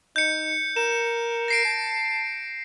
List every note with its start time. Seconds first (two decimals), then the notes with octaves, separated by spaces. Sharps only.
0.16 D#4 G6 C#7
0.76 A#4 E7
1.48 A#6 C7 D7
1.65 A5